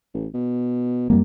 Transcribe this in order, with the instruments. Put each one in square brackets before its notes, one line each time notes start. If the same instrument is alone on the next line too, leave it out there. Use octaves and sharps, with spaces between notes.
[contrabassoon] A1
B2
[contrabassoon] F1 [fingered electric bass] F#2 G3 A#3